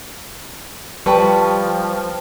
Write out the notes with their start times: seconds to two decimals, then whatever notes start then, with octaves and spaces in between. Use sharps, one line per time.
1.06 F3 G3 B4 G5 A5 C#6